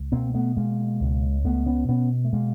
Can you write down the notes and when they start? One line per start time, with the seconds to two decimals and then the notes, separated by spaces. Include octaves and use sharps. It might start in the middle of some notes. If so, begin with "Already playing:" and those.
Already playing: C#2
0.12 B2 A#3 C4
0.34 A3 B3
0.57 B2 G#3 A#3
1.00 C#2
1.44 C#2 A3 B3
1.66 B3 C#4
1.88 B2 B3 C#4
2.24 A3
2.33 B2 G#3 A#3